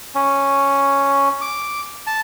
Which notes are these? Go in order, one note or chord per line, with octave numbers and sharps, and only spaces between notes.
C#4
D6
A5